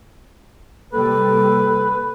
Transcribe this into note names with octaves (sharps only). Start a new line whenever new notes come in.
C3 G3 A#3 A4 B4